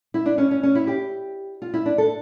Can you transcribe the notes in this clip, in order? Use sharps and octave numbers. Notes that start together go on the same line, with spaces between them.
E4
D4
C#4
C#4
C#4
E4
G4
F4
E4
D4
A4